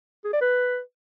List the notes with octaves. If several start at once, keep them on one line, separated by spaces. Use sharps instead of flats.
G#4
D5
B4